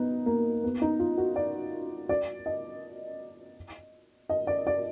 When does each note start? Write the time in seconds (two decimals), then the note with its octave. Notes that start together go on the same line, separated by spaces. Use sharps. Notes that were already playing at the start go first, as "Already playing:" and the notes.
Already playing: B3 D#4
0.26 A#3
0.64 B3
0.82 D#4
0.99 F4
1.18 F#4
1.36 D5
2.09 D5
2.46 D#5
4.29 D#5
4.47 D5
4.67 D5